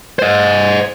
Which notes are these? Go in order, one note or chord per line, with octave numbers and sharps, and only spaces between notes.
C5 D#5